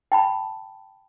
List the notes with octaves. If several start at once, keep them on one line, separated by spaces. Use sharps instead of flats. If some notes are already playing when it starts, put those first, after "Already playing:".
G5 A5 B5